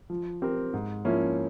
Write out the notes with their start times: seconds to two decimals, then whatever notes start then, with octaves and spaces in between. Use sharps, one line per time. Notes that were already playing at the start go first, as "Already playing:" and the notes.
0.10 F3
0.42 C4 G4 A#4
0.73 G#2
1.05 F3 A#3 C#4 E4